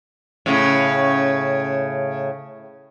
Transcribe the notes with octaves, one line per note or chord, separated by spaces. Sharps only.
A2 C#3